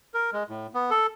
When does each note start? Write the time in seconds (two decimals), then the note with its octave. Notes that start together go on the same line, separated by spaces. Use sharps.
0.14 A#4
0.33 G#3
0.49 A2
0.74 B3
0.91 A4